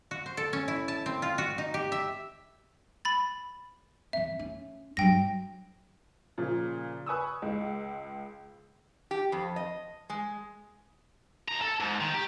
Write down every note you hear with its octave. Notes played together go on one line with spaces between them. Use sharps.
F#4
C5
A4
C#4
E4
A5
C4
F4
F#4
D#4
G4
E5
B5 A6
E3 C4 E5
C#4
G2 F#3 G5 A#6
A#2 C#3 F3
B4 G#5 C#6 D#6 E6
C#2 G#3
G4
F2
D#5
G#3
D#2 A#5
A4
G#2
D#3
G4